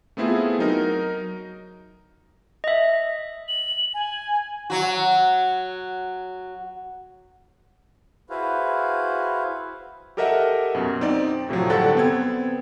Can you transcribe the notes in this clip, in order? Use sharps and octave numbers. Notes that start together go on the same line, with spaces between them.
A3 B3 C4 E4 F4 G#4
F#3 D#4 A#4
D#5 E5
F#7
G#5
F#3 F#4
E4 F#4 G#4 B4 C5 F5
G4 A4 A#4 D#5 E5 F#5
F#2 B2
C4 D#4 D5
A2 C3 F3 F#3
G2 D3 A4 F#5 G5 A6
B3 C4 G#6